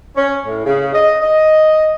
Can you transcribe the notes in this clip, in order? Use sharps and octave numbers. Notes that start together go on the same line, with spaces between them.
C#4
A2
C#3
D#5
D#5